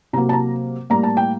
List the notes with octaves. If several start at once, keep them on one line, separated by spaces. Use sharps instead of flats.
C3 F#3 A#3 A#5
A5
A#5
A2 G3 A#3 A#5
A5
G5